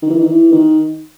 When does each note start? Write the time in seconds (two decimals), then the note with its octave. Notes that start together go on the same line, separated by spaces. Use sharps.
0.02 D#3
0.10 E3
0.18 D#3
0.27 E3
0.52 D#3